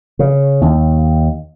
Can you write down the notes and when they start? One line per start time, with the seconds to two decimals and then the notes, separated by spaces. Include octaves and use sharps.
0.19 C#3
0.61 D#2